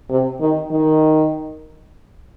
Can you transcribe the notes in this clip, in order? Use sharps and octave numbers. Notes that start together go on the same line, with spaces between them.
C3
D#3
D#3